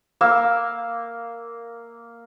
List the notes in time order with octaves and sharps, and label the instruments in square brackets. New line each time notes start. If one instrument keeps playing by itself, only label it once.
[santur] A#3 E6